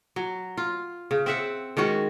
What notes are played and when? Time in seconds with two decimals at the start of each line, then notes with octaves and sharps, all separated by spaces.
0.16 F#3
0.57 F4
1.11 C#3
1.26 C4 E5 F#5
1.77 D#3 G#3 C#4 F#4